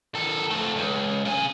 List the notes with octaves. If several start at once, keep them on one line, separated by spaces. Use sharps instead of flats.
D#3 A4
F2 A3
C#2
C#3 G#5